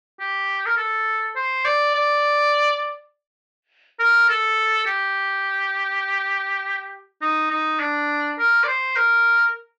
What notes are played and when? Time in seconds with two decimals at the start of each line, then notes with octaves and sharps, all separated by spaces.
0.20 G4
0.66 A#4
0.77 A4
1.36 C5
1.65 D5
1.95 D5
3.99 A#4
4.29 A4
4.87 G4
7.21 D#4
7.51 D#4
7.79 D4
8.39 A#4
8.64 D5
8.67 C5
8.96 A#4